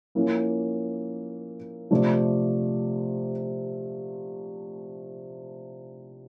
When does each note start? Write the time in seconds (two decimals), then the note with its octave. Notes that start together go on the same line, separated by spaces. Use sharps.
0.15 F3 A#3 C#4 E4
1.91 C3 F3 A3 D4